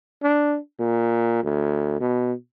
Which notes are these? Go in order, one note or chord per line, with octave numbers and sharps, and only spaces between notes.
D4
A#2
D2
B2